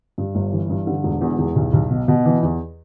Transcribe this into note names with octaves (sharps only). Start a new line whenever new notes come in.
G2
G1
E3
G2
D3
E1
E2
E2
B1
B1
B2
B2
E3
E2